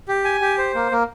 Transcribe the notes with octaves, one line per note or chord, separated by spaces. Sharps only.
G4
G#5
G4
C5
A#3
A#3